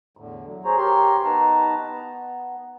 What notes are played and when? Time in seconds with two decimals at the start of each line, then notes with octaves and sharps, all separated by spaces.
0.17 E2 A2 D3
0.45 F#3
0.65 G#4 C5 C#5 A#5
0.77 G4 A#4 C#5 C6
1.24 B3 D#4 B4 A5 A#5
1.86 B3